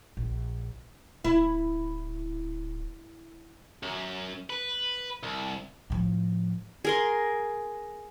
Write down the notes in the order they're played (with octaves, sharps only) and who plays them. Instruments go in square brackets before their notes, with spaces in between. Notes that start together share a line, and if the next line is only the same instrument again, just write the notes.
[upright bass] A#1
[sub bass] D1 [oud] E4
[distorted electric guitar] F#2
B4
C2
[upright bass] A2 F3
[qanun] G#4 A#4 C6